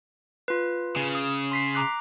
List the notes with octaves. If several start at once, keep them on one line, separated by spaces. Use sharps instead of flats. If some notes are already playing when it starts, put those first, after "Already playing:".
F4 B4
C#3
D#6
C6 B6 C7
A#5 D6 F#6